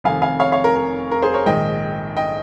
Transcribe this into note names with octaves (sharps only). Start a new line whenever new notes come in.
F1 F2 C3 D#3 F5 G#5
F5 G#5
C#5 F5
C#5 F5
A#4
A#4
A#4
G#4 C5
A#4 C#5
A#1 G#2 D#3 D#5 G5
D#5 G5